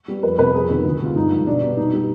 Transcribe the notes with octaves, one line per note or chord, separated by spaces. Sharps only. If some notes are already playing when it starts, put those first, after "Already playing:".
G3 B3
F2 B4
C3 G3 B3 B4
F2 G#4
C3 D#3 B3
D2
C3 G3 B3 F4
G2 D#4
F3 G#3
B2 D4
G3 B3
B2 D#4
G3 B3